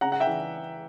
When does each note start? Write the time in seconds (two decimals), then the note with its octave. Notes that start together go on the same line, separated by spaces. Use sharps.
0.01 C#3 F#5 A#5
0.12 F#5
0.20 E5 G5
0.27 E3